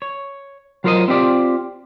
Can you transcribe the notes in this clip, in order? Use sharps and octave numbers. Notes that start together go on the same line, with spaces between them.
C#5
F#3 F4 A#4 C5 D5 D#5
C4 F4 G4 D5